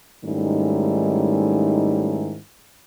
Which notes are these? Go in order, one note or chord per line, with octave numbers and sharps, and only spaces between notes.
G#2 D#3 G3 A3 C#4 E4